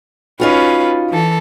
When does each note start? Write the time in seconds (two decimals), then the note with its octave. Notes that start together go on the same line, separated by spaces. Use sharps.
0.40 C#4 D#4 F4 F#4 B4 F5
1.10 E3 A4